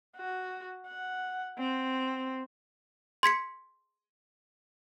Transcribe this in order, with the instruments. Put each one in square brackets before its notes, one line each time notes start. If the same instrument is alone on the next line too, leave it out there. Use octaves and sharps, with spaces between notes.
[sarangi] F#4
F#5
C4
[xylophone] C6 G#6 B6 C#7